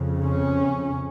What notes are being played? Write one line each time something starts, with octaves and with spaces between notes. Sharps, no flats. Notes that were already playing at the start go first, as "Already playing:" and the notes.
Already playing: F2 C#3
C#4